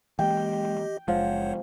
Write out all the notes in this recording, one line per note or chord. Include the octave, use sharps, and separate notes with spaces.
E3 G#3 A#3 G4 D#5 G5
F#1 F3 G#3 C5 C#5 F#5